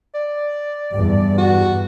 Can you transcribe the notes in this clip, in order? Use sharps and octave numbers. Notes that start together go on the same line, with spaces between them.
D5
E2 G2
F#4